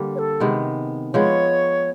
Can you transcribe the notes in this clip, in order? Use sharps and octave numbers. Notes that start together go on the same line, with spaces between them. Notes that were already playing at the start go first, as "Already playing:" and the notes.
Already playing: D3 G3 A#3
C#5
A4
C3 D#3 G#3 B3
F3 G#3 B3 C#5